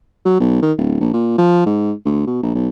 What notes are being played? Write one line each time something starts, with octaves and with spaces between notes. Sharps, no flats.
F#3
B1
D#3
D1
A#1
A#2
F3
G#2
D2
B2
A#1
B1